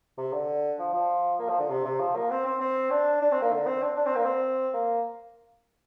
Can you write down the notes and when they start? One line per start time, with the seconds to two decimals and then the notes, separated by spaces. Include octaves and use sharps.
0.18 C3
0.33 D3
0.79 F3
0.93 F3
1.39 A#3
1.49 F3
1.59 D3
1.70 C3
1.85 C3
2.00 F3
2.16 A#3
2.30 C4
2.46 C4
2.61 C4
2.91 D4
3.22 D4
3.32 C4
3.42 A#3
3.52 D3
3.67 C4
3.83 D4
3.97 D4
4.06 C4
4.16 A#3
4.25 C4
4.73 A#3